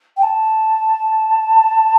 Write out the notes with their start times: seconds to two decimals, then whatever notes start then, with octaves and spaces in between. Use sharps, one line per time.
0.17 G5
0.22 A5